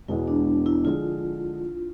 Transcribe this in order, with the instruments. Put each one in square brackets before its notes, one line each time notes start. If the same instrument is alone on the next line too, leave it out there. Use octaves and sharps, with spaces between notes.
[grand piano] E1 E2 B2 G#3 B3 [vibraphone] E4
[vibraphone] D4
E4
[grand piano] D3 F3 G#3 [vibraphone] F4